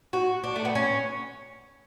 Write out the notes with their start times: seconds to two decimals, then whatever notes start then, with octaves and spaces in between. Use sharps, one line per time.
0.13 F#4
0.44 D4
0.56 A3
0.65 B3
0.75 C#4